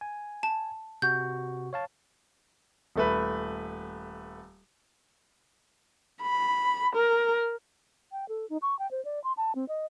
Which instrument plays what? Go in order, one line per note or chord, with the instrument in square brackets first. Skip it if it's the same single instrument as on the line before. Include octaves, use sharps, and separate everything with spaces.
[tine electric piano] G#5
[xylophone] A5
[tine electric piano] C3 F#4 [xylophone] G6
[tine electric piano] C#5 F5 A5
[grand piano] D#1 A3 B4
[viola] B5
A#4
[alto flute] G5
A4
D#4
C#6
G5
C5
D5
C6
A5
C4
D#5